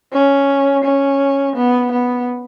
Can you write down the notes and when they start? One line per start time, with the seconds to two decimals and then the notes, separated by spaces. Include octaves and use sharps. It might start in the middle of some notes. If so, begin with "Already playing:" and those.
0.13 C#4
0.85 C#4
1.56 B3
1.92 B3